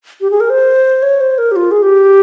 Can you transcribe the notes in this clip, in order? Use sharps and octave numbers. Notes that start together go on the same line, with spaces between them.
G4
G#4
A#4
C5
C#5
C5
A#4
G4
F4
G#4
G4